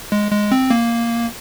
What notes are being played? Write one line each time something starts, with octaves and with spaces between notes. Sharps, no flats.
G#3
G#3
C4
A#3